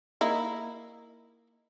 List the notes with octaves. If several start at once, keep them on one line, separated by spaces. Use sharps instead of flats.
A#3 D#4 E4